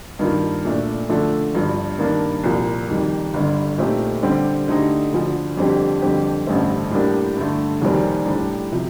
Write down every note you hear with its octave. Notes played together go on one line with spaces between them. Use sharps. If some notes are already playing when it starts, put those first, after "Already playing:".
G2 D#3 A#3 F4
A#2 A3 D4
D3 F3 A3 D4 A4
G1 G2 F3
G2 D#3 A#3 D4
C2 A#2 F3 A#3
F2 D#3 G3
G1 G2 D3
A#2 A3 C4 D#4 G4
D3 G3 C4 G4
D3 A3 D#4 G4
D2 D3 F3
F2 D3 G3 C4 G4
F2 D3 G3 C4 G4
A1 G2 D3 A3 C4
A2 G3 A#3 D4 G4
G2 D3 A3
F1 D#2 D#3 G3 C4
A2 G3 D4
C3 F3